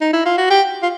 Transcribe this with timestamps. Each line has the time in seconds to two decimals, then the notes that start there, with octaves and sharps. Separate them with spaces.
0.01 D#4
0.13 E4
0.26 F4
0.38 F#4
0.50 G4
0.82 F4